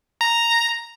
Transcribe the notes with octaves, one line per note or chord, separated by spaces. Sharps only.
A#5